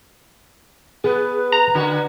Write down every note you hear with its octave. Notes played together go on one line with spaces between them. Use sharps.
B3 G#4 B4
A#5
D3 F#4